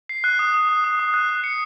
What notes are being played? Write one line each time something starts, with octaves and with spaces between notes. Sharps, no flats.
C7
F#6
D#6
D#6
D#6
D#6
D#6
F#6
F#6
C#7